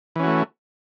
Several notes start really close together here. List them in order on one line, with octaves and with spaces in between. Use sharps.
E3 C#4 F#4 A3